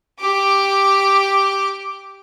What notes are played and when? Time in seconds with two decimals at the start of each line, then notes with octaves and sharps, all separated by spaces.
0.21 G4 D6